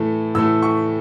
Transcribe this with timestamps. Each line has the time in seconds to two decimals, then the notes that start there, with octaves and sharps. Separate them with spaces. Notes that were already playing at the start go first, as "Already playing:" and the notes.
Already playing: A2 E3 A3
0.35 A2 E3 A3 E6
0.62 C#6